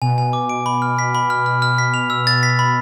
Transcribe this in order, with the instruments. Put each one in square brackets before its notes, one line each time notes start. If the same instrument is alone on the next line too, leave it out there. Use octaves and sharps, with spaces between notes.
[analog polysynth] B2 [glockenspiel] G#5
[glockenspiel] G#5
D6
D7
B5
F6
B6
B5
F6
F6
F6
B6
F7
E6
A6
B6
B5